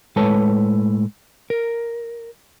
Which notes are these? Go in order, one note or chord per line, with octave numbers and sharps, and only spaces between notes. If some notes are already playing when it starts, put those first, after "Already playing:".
A2 G#3 A4 B4 C#5 A5
A#4